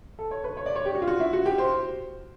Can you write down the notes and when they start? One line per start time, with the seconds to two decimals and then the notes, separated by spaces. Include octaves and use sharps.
0.19 A4
0.31 C#5
0.44 B4
0.57 C#5
0.66 D5
0.76 C#5
0.85 G4
0.95 F#4
1.02 F4
1.07 F#4
1.20 E4
1.33 F#4
1.46 G4
1.58 C5